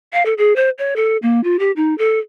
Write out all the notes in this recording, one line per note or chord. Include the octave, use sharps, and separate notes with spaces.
F5
A4
G#4
C5
C#5
A4
A#3
F4
G4
D#4
A4